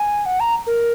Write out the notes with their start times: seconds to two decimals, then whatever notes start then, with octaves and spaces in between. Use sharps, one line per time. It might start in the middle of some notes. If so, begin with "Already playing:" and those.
Already playing: G#5
0.26 F#5
0.40 A#5
0.67 A#4